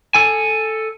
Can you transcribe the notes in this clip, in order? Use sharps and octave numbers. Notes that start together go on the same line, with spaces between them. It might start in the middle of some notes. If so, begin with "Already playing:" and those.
A4 G#5